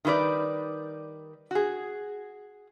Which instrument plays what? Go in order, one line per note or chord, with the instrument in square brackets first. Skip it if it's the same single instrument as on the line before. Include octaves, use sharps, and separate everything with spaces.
[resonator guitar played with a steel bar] D#3 G3 E4 B4 D5
F#4 G#4